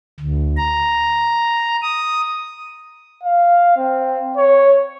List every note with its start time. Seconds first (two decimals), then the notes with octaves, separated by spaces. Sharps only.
0.20 D2
0.57 A#5
1.82 D#6
3.23 F5
3.77 C4
4.37 C#5